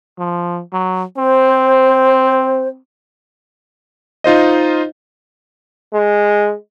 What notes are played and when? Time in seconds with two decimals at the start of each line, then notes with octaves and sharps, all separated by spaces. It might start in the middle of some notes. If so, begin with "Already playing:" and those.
0.18 F3
0.73 F#3
1.17 C4 C5
4.24 D#4 F4 C5 D#5
5.94 G#3